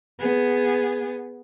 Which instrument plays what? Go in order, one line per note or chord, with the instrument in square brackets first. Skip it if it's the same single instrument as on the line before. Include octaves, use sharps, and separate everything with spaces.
[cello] B3 G#4